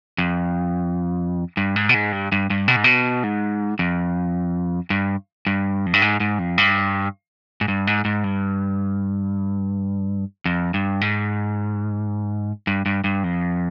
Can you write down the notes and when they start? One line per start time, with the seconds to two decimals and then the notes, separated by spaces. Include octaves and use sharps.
0.18 F2
1.57 G2
1.76 G#2
1.89 B2
1.94 G#2
2.12 G2
2.32 G2
2.50 G2
2.68 B2
2.76 G#2
2.84 B2
3.24 G#2
3.79 F2
4.90 G2
5.47 G2
5.86 F2
5.93 G2
6.02 G#2
6.20 G#2
6.39 F2
6.58 G2
7.61 G#2
7.68 G2
7.87 G#2
8.05 G#2
8.24 G2
10.46 F2
10.74 G2
11.01 G#2
12.67 G2
12.86 G2
13.04 G2
13.24 F2